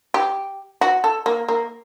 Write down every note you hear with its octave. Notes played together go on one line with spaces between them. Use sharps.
G4
F#4
A4
A#3
A#3